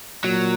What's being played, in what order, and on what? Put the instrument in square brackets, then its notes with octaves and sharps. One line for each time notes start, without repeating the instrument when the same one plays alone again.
[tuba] A#2 [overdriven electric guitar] F#3